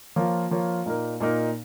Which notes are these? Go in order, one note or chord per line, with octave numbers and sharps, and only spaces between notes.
F3 A#3 F4 C#5
F3 A#3 F4 C#5
A#2 A#3 D#4 A#4
A#2 A#3 D#4 A#4